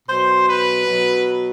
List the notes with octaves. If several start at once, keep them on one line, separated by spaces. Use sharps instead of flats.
B2 F#3 C5
B4
B2 F#3